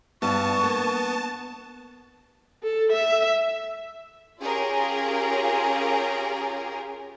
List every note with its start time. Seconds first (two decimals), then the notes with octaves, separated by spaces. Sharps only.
0.22 G2 B3 A5 C#6
0.63 A#3
2.63 A4
2.92 E5
4.41 C#4 F4 G4 G#4 A#4